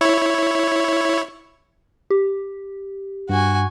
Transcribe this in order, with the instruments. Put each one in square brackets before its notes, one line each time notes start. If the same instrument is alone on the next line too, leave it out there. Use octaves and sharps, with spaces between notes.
[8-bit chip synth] E4 C#5
[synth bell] G4
[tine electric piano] G2 [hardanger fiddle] F#4 G#5